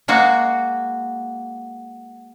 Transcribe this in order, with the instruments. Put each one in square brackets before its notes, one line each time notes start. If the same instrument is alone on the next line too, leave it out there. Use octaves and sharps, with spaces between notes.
[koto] G#3 A#3 F#4